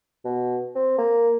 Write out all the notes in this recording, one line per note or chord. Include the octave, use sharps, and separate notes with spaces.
B2
C4
A#3